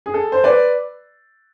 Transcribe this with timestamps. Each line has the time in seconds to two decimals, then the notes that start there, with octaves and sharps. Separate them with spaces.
0.06 G#4
0.14 A4
0.32 C5
0.44 B4 D5